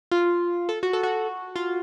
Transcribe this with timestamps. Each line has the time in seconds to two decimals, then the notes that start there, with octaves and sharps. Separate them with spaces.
0.11 F4
0.69 A4
0.83 F#4
0.93 A4
1.03 F#4
1.56 F4